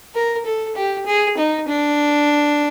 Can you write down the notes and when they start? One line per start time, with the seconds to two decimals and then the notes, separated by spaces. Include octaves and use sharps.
0.15 A#4
0.46 A4
0.76 G4
1.06 G#4
1.37 D#4
1.68 D4